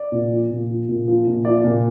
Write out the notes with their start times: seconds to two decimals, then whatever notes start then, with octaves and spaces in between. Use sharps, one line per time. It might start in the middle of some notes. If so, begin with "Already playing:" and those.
Already playing: D5
0.12 A#2
0.32 F3
0.51 A#2
0.70 F3
0.89 A#2
1.08 F3
1.27 A#2
1.45 F3 D5
1.64 A#2